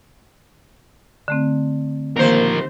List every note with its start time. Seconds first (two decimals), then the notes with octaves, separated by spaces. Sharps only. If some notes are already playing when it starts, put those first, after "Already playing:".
1.28 D3 A3 C4
2.17 D#2 F3 A#3 A#4 C5